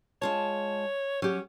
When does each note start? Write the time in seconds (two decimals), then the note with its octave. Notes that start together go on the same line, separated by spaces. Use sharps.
0.22 G#3 F4 C#5 A5
1.22 F#3 C#4 G4